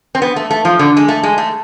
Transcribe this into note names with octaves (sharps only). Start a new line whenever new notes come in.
C4
B3
A3
A3
F3
D3
G#3
A3
G#3
A3